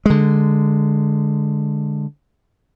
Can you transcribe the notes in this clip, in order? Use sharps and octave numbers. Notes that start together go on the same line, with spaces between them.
D3 G#3